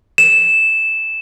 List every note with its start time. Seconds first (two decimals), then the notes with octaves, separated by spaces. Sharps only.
0.18 E7